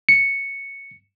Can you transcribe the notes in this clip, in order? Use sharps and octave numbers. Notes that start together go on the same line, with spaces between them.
C#7